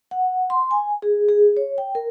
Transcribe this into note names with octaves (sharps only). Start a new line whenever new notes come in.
F#5
C6
G#5
G#4
G#4
C#5
G5
A#4